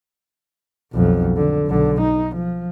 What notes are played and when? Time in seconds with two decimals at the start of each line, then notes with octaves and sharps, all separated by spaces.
0.92 B1 F2
1.37 D3
1.67 B1 D3
2.01 D#4
2.36 F3